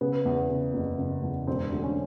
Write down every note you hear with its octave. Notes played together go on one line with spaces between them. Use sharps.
C#3 B3
E2
C#3
F#1
F#1
E2
E1 C4
D2
C#4